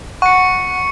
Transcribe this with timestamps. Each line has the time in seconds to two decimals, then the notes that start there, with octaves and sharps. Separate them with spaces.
0.22 F#5 C#6 C#7